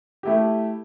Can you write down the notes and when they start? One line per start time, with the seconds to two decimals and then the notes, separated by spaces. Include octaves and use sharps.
0.23 A3 E4 G4